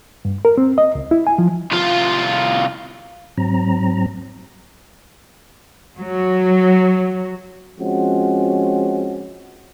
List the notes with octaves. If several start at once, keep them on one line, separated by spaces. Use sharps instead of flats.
G2
A#4
C4
D#5
C#2
E4
G#5
F3
C2 F4
G#2 F#3 C4 A#5
F#3
F3 G#3 C4 C#4 F#4